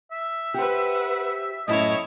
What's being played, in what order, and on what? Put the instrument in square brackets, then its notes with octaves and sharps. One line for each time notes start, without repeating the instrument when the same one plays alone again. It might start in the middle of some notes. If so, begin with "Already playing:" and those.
[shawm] E5
[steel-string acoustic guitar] G4 C5 [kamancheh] B4 F#5
[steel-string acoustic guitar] F#2 A2 [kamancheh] E4 C#5 [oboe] D#5